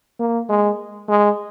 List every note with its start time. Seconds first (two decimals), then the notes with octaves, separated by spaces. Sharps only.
0.20 A#3
0.49 G#3
1.09 G#3